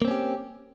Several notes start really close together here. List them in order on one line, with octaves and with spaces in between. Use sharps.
A#3 C4 C#4 G4